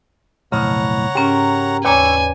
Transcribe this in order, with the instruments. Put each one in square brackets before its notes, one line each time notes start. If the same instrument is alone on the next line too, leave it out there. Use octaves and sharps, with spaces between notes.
[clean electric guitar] B1 F2 A2 [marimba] C#3 [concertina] C#5 F#5 A#5
[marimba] G#2 C#4 [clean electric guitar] G4 A#4
[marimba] D#2 C#5 A#5 [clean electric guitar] B4 D5 [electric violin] G#5 [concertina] C#6 E6